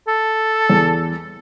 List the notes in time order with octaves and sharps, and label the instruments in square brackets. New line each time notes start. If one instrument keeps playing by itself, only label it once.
[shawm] A4
[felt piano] E2